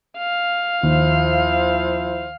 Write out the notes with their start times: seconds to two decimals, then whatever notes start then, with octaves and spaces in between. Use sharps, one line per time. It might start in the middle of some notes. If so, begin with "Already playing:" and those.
0.18 F5
0.83 D#2 F3 E4 C5